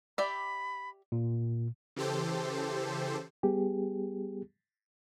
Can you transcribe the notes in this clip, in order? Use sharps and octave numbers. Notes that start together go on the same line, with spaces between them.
G4 D5 E5 B5
A#2
C#3 E3 G4 A4 C5
G3 B3 G4 G#4